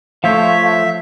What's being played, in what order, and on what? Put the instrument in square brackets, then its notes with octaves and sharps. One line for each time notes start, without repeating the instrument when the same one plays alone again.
[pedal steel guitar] F3 C5 C#5 [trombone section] A3 [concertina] E5 [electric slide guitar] F5